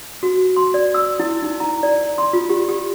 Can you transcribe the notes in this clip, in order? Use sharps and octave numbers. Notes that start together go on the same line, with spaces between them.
F#4
C6
D5
E6
E4
D#4
A#5
D5
C6
F4
G4
G4